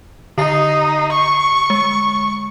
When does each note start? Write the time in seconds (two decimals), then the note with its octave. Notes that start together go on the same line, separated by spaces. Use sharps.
0.38 D3 D#4 C7
1.12 C#6
1.70 G#3